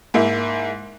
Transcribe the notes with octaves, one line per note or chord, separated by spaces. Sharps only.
G#2 A#3 E4